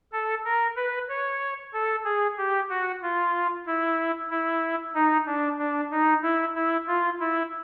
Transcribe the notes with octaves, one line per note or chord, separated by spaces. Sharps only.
A4
A#4
B4
C#5
A4
G#4
G4
F#4
F4
E4
E4
D#4
D4
D4
D#4
E4
E4
F4
E4